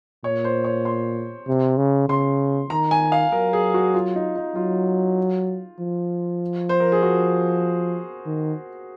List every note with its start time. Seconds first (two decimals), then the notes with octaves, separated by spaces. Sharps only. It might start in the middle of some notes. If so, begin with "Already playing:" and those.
0.24 A#2 C#5
0.44 C5
0.64 C#5
0.85 C6
1.47 C3
1.78 C#3
2.09 C#3 C6
2.70 D#3 A#5
2.91 G#5
3.12 F5
3.32 F#3 A#4
3.53 G#4
3.74 F#4
3.94 F4
4.15 D#4
4.36 D#4
4.55 F#3 F4
5.80 F3
6.69 C5
6.80 A#4
6.92 G#4
7.02 F#4
8.26 D#3